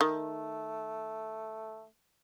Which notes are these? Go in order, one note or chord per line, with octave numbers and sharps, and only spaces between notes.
D#3 A3